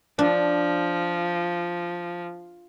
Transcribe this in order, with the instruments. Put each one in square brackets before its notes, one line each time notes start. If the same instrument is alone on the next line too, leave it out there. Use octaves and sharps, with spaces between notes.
[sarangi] F3 [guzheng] D4